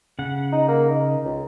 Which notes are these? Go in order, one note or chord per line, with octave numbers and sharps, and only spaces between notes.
C#3 F#5
D#4
A#3
D#4
C#2